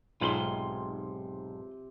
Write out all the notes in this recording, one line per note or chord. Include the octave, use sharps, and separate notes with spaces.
B1 G#2 C3 F4 B5 C6